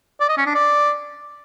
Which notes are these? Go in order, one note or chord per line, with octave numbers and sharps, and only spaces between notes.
D5
D#5
C#4
D4
D5